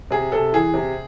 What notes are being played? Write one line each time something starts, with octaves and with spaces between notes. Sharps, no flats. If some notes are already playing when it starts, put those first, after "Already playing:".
C3 G#4
C3 A4
E3 G#4
C3